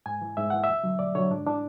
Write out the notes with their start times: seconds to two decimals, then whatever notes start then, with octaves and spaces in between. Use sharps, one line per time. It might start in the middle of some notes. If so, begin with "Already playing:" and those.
0.06 G#2 G#5
0.22 E3
0.37 G#2 E5
0.50 E3 F#5
0.64 E5
0.69 D2
0.84 D3 F#3
0.99 D2 D5
1.15 D3 F#3 C#5
1.31 G#2 D4
1.46 E3 D4